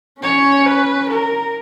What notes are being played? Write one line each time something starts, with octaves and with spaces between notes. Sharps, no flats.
C#4 C#5
B4
A#4